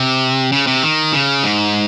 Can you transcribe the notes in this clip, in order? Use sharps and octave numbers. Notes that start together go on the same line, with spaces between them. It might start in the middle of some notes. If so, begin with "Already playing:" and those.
Already playing: C3
C#3
C3
D#3
C#3
G#2